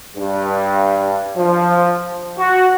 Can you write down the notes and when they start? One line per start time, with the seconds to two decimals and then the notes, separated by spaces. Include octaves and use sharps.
0.16 G2
1.37 F3
2.37 F#4